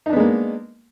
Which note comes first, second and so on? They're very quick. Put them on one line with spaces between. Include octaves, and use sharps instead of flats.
D#4 D4 B3 G#3 A#3